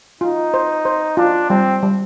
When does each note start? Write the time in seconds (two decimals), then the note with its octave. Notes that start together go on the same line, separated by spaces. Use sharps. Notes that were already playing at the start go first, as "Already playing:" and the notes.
0.21 D#4 F4
0.54 C5
0.85 C5
1.17 D4 F4
1.49 G3 C4
1.82 G3